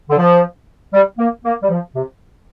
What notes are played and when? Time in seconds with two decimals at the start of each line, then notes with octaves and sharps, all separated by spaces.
0.10 D3
0.18 F3
0.94 G3
1.19 A#3
1.44 A#3
1.63 G3
1.70 F3
1.95 C3